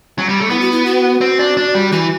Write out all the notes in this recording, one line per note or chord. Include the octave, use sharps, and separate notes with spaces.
F#3
G3
A3
B3 E4
F#4
E4
F#4
C4
D4
D4
G3
E3 F#4